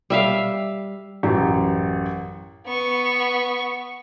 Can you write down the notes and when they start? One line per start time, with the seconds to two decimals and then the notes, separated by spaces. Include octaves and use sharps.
0.10 G3 E5 F5
1.23 A1 F#2 G4
2.66 B3 C#6